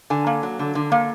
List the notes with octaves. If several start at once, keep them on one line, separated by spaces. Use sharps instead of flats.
D3 G#5
A#3
F#3
D3
D3
A#3